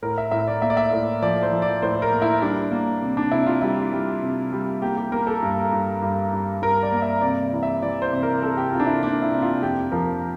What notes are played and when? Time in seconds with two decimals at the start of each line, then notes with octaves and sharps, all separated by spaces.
0.02 A2 A#4
0.18 E5
0.31 A2 E5
0.48 D5
0.62 A#3 E5
0.70 D5
0.77 E5
0.93 A2
1.22 F3 D5
1.43 C5
1.52 F3
1.62 D5
1.82 A2 C5
2.02 A#4
2.13 A#3
2.22 E4
2.42 G3 D4
2.72 A#3
3.02 C3
3.17 D4
3.32 C3 E4
3.47 F4
3.62 G3 E4
3.93 G3
4.23 C3
4.53 G3
4.82 A#3 G4
4.97 G4
5.12 A#3 A#4
5.27 A4
5.42 G2
5.72 G2
6.02 G2
6.33 G2
6.62 G2 A#4
6.83 D5
6.92 A#3
7.02 E5
7.22 C3 D5
7.52 E3
7.63 E5
7.83 E3 D5
8.02 C5
8.12 C3
8.23 A#4
8.42 C3 A4
8.57 G4
8.73 C3 F4
8.80 D4
8.87 E4
9.03 A#3 D4
9.22 E4
9.33 C3
9.42 F4
9.62 F2 G4
9.92 F3 A#4